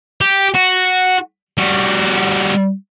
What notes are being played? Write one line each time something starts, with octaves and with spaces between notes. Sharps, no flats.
G4
F#4
G3 F#4